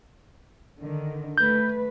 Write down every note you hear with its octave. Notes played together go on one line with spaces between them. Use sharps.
D3 D#3
A3 B4 G6